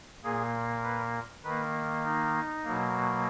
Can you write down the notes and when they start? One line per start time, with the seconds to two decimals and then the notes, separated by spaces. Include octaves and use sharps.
0.24 A#2 A#3 G#4
0.83 B4
1.44 D#3 A#3 B4
2.05 D#4
2.64 B2 F#3 A#3